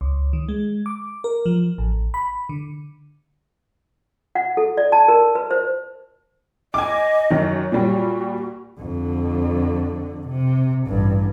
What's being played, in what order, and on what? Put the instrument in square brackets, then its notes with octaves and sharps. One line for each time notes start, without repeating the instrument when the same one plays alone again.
[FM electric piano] C#2
D#3
G#3
D6
A#4
F3
A1
B5
D3
[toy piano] F#5
A4
D5
A5
A#4
B4
C5
[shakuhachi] D#5 [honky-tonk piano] G#5 D6
[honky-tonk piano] F#2 D#3
[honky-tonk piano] A#2 G3 [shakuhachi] F#4
[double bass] F2 D3
C3
A1 G2